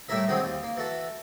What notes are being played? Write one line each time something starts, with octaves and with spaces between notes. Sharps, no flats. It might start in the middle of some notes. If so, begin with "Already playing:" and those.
A2 G3 A3 E4 A#4 E5
D#3 F#3 G#3 C4
D#2
A#3
E3 F#4 A4